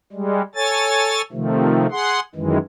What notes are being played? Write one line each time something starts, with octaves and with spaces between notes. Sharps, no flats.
G3 G#3
A4 C#5 G#5 A6
C3 D#3 F3 A3
G#4 F#5 C6
F#2 D#3 E3 G#3